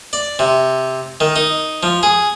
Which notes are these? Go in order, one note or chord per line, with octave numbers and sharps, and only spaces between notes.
D5
C3
D#3
D#4
F3
G#4